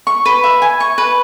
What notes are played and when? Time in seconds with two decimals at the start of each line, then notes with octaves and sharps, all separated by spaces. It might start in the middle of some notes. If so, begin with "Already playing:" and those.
0.07 C#6
0.26 B4
0.44 E5
0.62 G#5
0.80 C#6
0.98 B4